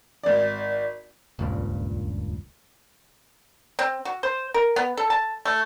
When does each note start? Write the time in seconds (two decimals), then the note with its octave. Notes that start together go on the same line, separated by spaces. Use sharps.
0.23 G#1 D5
1.39 D#1 C#2 G2 A#2
3.79 C4
4.05 F#4
4.23 C5
4.54 A#4
4.76 B3
4.97 A4
5.10 A5
5.45 A3